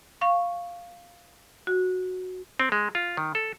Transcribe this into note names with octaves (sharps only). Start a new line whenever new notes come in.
F5 C#6
F#4
C4
G#3
F4
D#3
A4